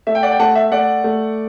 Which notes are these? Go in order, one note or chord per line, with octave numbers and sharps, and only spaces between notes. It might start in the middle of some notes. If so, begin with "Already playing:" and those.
A3 E5
G5
D5 F#5
G5
A3 F#5 A5
E5
A3 D5 F#5
A3